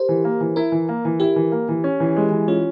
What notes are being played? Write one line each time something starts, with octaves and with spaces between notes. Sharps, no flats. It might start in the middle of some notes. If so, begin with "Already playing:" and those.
Already playing: G4 A#4 C5
E3
A#3
E3
E4 A#4
E3
A#3
E3
E4 G4
E3
A#3
E3
C#4
E3
G#3
E3
C#4 F4